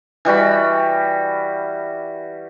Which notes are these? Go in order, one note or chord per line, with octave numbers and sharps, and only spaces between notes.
E3 G3 F#4 B5